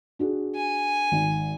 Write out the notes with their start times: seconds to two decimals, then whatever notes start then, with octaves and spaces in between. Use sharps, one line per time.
0.19 D4 F#4 G#4
0.56 G#5
1.12 G#1